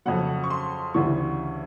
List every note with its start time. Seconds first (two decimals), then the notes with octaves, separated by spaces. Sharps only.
0.05 F2 C#3 F#3 F#5
0.44 C#6
0.50 C6
0.94 D2 C#3 E3 G3 C#6